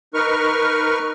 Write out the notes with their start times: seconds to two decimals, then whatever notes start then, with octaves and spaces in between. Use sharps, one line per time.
0.14 D#4 A#4 B4 C#6 F6